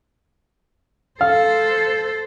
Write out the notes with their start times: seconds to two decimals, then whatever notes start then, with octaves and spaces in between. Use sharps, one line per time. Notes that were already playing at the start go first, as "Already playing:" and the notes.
1.21 A4 C5 F5